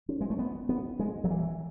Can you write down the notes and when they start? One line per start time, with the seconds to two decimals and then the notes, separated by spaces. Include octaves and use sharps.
0.09 C#4
0.21 G#3
0.30 A3
0.39 B3
0.69 B3
0.99 G#3
1.24 F#3
1.30 E3